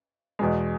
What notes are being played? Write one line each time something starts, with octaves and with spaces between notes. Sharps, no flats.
E2 B2 G#3